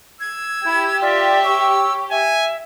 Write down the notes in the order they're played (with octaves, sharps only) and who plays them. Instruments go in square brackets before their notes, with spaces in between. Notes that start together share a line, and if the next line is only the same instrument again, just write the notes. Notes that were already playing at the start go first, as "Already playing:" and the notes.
[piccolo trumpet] E6 [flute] G#6
[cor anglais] E4 [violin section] G4
[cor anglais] F4 [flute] D5 [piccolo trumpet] E5
[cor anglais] C#5 [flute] E6
[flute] E5 [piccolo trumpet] G#5